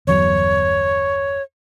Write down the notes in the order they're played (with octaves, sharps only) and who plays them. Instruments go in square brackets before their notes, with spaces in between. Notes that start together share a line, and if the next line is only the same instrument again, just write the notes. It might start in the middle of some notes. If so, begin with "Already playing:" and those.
[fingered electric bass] G1 E2 F#3 [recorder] C#5